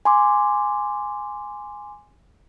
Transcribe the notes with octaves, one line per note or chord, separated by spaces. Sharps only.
G#5 C6 D6